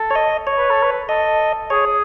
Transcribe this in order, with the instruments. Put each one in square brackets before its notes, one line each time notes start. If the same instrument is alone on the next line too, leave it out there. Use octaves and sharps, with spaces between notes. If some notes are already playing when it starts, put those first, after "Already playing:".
Already playing: [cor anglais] A4
[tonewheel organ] C#5
D#5
C#5
[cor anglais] B4
A4
B4
[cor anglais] A4 [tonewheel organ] D#5
[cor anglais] G#4 [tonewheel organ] C#5